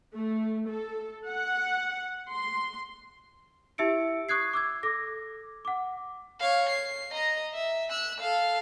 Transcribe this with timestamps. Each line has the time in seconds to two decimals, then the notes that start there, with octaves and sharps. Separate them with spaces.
0.14 A3
0.68 A4
1.29 F#5
2.31 C6
3.78 E4 G4 E5 E6 C#7 D7
4.29 C#6 D#6 F#6 G#6 C7
4.53 D6 E6 G#6
4.83 A4 D6 A#6
5.65 F#5 D6
6.40 C#5 F5
6.69 C7
7.12 D#5 A#5
7.54 E5
7.91 E6 F#6
8.21 A4 F5